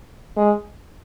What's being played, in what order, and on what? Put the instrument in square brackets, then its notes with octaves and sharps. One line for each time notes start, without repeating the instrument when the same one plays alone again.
[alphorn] G#3